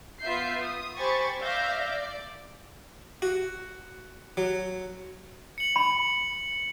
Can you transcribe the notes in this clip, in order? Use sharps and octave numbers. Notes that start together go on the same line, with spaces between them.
B3 F4 E5 G6 C7
D#6
G4 C5 G#5 B5 C#6 A6
D5 E5 F5 G6 A#6
D5
F#4
F#3
C#7 F#7
B5